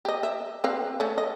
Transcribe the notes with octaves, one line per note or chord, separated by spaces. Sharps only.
G4 D#5
E5
C4 B4 F5
A3 C#4
D#5